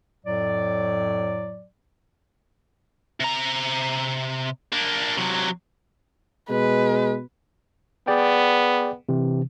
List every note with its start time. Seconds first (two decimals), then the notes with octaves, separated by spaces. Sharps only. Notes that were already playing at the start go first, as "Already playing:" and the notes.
0.24 F2 A2 F#3 D5
3.20 C3 A#5
4.72 A#3 D4
5.17 C3 F#3
6.50 B2 G#3 B4
8.07 B3 G#4 D5 G5
9.09 C3 E3